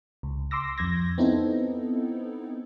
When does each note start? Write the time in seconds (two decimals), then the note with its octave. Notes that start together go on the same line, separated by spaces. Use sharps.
0.23 C#2
0.51 C6 D6 E6 A#6
0.78 F2 G6 G#6 A#6
1.18 B3 C4 D#4 E4 A4